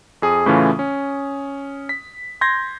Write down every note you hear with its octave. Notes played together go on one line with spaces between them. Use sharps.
F2 G#4 D#6
A2 C#3 E3 A3 C#4 F4
C#4
B6
C6 G6 G#6 A#6